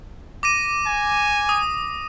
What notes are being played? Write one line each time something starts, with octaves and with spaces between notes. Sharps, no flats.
D6 A#6 D#7
G#5
D#6